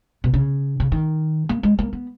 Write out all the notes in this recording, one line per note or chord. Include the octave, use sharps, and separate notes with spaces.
B2
C#3
C#3
D#3
A#3
G#3
A#3
B3